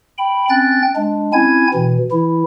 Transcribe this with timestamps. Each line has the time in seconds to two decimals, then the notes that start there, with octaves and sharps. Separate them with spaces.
0.18 G5 B5
0.49 C4 C#4 G5 F#6 A6
0.96 G#3 D4
1.33 C4 C#4 E4 G#5 G#6
1.74 B2 E3
2.11 E3 E4